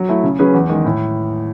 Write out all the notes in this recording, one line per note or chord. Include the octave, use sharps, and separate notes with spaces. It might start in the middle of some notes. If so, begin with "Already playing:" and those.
Already playing: F#3
A3 E4
C#3
F#3 C#4 G#4 B4
E2
D#3 G#3
A2